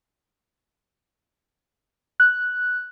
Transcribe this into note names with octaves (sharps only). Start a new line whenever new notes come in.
F#6